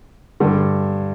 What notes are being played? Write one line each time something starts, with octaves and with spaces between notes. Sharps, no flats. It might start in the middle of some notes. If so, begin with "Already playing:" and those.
G2 D3